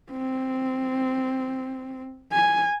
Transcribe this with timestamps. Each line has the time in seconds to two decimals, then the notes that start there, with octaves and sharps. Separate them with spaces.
0.11 C4
2.32 G#5